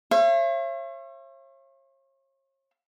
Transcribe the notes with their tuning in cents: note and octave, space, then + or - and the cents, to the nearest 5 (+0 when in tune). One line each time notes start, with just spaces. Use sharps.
C#5 -40 E5 +45